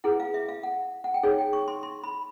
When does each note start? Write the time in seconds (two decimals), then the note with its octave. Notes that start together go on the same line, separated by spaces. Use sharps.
0.04 E4 G#4 B4 F#5
0.20 F5
0.34 E5
0.48 F5
0.63 F#5
1.04 F#5
1.14 G5
1.23 D#4 G#4 C#5 G#5
1.38 G5
1.53 C#6
1.68 C6
1.83 C6
2.04 B5